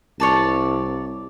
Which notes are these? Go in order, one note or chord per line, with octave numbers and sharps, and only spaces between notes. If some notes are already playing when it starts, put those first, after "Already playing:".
C2 C#5 D5 A5